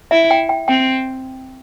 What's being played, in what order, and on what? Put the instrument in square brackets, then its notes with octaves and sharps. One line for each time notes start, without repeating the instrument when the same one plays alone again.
[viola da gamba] E4 [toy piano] E5
[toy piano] G5
G5
[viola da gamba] C4 [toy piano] G5